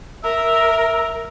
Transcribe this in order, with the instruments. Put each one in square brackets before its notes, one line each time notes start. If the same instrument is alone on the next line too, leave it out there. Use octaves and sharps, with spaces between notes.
[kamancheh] A#4 [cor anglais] E5